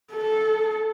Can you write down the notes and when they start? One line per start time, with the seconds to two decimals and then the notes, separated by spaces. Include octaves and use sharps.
0.12 A4